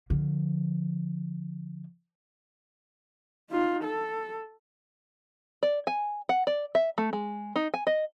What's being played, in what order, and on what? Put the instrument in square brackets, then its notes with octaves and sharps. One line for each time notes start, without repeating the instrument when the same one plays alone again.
[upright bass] D3 F3
[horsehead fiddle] D#4 F4
A4
[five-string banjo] D5
G#5
F#5
D5
E5
A3
G#3
D#4
G#5
D#5